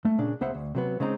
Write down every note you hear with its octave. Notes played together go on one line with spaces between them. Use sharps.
A3
A#2 C#3 D4
C#2 B3 C5 E5 F#5
D2
C3 F#3 B3
C#3 G#3 C4 D#4